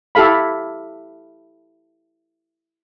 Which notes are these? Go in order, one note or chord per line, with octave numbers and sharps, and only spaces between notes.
E4 G4 A4 F5 B5